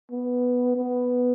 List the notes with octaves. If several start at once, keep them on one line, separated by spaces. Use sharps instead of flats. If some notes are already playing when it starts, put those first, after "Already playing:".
B3
B3